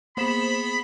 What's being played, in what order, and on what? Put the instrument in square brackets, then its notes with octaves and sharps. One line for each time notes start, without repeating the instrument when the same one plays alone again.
[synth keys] A#3 C5 E7 [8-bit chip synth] B3 G#4 [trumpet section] B5